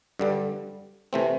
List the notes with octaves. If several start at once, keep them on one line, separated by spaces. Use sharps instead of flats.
G2 D3 G3
C3 E3 A3 C4